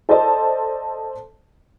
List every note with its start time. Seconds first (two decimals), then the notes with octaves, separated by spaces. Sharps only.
0.09 A4 C5 D5 D#5 A5